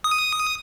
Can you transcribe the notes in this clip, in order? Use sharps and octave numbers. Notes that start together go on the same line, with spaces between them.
D#6